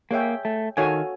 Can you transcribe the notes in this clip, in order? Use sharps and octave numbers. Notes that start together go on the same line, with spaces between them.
A#3 G#4 C#5 E5 G5
A3
D#3 F#4 A4 C#5 F5 G#5